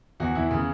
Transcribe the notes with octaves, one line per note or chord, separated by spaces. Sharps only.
E2 F#4
E2 E4
C#3